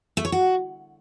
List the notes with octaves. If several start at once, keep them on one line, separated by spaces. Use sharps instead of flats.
A3
C#5
F#4